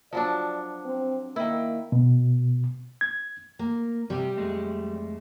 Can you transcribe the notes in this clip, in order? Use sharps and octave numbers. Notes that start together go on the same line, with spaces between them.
F3 F#3 D4 D5
C4
D#3 A#3 E4
B2
G#6
A#3
C3 G3 F#4 G4
F2 G#3 A3